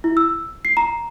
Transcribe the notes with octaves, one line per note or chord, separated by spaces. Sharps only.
E4
E6
C7
A#5